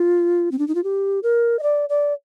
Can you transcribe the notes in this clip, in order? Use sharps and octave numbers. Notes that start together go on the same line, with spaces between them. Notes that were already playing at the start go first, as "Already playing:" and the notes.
Already playing: F4
C4
D4
D#4
F4
G4
A#4
D#5
D5
D5